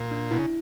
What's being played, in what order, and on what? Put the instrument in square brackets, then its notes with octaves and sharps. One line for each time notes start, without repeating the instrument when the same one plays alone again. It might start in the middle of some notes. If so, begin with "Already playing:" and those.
Already playing: [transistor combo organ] A#2
[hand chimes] D4
[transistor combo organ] B2 [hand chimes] E4
[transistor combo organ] C#3